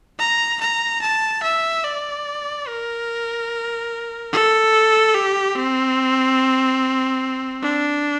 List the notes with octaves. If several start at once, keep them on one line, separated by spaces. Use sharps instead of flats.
A#5
A#5
A5
E5
D5
A#4
A4
G4
C4
D4